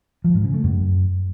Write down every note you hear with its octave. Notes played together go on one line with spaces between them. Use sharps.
F3
G#2
C#3
A3
F#2